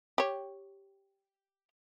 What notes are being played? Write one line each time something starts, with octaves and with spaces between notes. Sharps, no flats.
G4 C#5